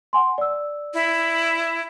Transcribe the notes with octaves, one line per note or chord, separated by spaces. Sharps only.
F#5 G#5 C6
D5 E6
E4